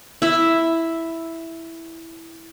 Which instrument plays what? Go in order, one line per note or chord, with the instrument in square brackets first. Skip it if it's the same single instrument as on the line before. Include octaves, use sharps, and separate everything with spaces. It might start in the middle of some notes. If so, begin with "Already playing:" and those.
[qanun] E4 E5